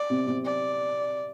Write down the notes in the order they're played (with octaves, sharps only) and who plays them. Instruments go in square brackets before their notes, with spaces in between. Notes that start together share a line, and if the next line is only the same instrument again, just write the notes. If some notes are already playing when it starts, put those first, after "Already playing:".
Already playing: [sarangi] D5
[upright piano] C3 C4
C3 C4
[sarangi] D5